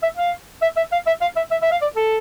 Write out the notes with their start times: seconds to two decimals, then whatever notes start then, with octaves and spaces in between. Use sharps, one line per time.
0.03 E5
0.17 F5
0.62 E5
0.77 E5
0.92 F5
1.07 E5
1.22 F5
1.37 E5
1.51 E5
1.62 E5
1.72 F5
1.82 D5
1.96 A4